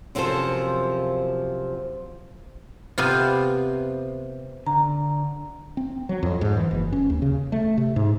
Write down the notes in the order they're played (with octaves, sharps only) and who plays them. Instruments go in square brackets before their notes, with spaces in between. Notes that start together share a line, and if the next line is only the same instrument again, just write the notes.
[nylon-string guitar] F#2 C3 F3 C4 A4 C5
[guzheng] C3 B3 C4 F4
[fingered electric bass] D3 [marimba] A#5
[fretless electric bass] C4
F#3
F2
G#2
E3
F#1
C#4
D#2
C#3
A3
C3
G#2